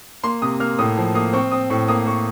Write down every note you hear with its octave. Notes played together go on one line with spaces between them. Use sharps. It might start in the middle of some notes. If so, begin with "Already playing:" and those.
A#3 C6
C3 D#6
A#3 F6
A2 D#6
F3
A#3 D#6
C4 C#6
C4 D#6
A2 C#6
A#3 D#6
A#3 C#6